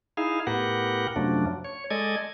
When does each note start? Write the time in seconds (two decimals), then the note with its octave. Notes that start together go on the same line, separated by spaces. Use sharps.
0.17 D#4 E4 G#4 F5
0.47 A2 B3 G4 A#4 F#5
1.16 F#2 C3 F3 F#3 A3 D4
1.64 C#5
1.90 G#3 A4 D5 D#5 G#6